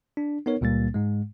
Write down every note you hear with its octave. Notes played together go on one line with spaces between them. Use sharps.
D4
B3 D#4 A#4 C#5
C#2 A#2 G3 A#3 A6
G#2 G#3